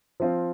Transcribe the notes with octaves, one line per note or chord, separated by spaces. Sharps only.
F3 C4 F4